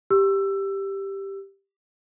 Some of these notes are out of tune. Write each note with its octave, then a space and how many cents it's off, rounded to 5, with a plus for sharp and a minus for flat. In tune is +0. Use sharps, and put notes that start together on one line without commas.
G4 +0 E6 +20